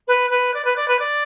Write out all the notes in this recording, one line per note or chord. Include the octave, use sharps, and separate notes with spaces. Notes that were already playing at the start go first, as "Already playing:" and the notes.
B4
B4
D5
B4
D5
B4
D5